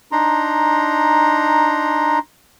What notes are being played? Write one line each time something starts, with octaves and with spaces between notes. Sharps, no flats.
D4 D#4 A#5 C6